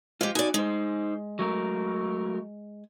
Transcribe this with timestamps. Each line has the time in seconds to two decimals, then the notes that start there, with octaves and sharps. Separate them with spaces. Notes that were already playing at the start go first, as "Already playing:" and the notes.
0.21 G#3 F4 G4 C5
0.35 D#4 F#4 D5 G#5
0.54 G#3 D#4 C5
1.39 F#3 A3 A#4